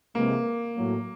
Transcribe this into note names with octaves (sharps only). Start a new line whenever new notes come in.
C3 E3 G#3 A#3
A2 F#3 A#3